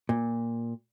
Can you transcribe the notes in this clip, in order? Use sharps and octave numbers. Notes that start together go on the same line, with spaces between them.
A#2